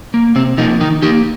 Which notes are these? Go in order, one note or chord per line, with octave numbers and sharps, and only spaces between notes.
A#3
C3 C4
F3 A#3 D#4
D#3 D#4
A#3 D#4 G4